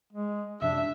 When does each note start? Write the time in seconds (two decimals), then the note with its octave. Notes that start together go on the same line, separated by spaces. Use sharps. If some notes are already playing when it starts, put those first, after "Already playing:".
0.13 G#3
0.62 F#2 C3 F3 D4 E5